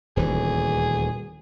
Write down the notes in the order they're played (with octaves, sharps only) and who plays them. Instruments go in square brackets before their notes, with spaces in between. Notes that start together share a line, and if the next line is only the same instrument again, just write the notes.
[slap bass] D#1 D2 E3 [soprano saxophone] G#4